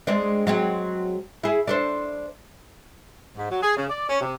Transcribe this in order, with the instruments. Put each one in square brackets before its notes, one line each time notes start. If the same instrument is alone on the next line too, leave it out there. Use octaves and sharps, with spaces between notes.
[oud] G#3 C4 D4
F#3 G#3 C4
E4 G#4
D4 A4 C5
[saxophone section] G#2
F#3
G#4
C#3
D5
C#4
C3